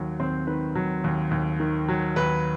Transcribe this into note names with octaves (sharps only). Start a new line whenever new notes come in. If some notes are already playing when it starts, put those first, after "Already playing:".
Already playing: D#2 F#3
D#2 C4 C5
D#3 B4
F#3
D#2
D#2
D#3
F#3
D#2 B4